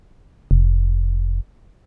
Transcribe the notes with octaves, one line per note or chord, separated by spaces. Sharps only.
F1